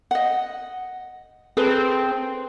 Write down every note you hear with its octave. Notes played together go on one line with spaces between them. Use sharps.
D#5 F#5
C4 G#4 A4 B4